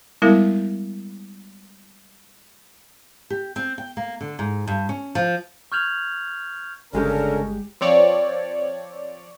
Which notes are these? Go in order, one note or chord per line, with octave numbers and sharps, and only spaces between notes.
G3 G#3 B3 E4 A#4
G4
C4
G5
A#3
D3
G#2
G2
C#4
F3
C#6 F6 G6 G#6 F7 F#7
G1 C#3 G#3 C#4 D4 G4 A4 A#4
F3 C4 C#5 D5